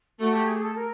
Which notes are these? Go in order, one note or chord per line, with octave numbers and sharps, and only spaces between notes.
A3 F#4
G4
G#4
A4
A#4